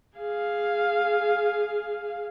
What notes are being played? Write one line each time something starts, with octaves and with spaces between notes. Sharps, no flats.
G#4 F5